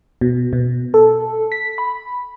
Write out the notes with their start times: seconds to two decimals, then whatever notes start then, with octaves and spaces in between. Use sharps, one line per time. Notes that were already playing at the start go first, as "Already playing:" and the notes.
0.21 B2
0.53 B2
0.94 A4
1.52 B6
1.78 B5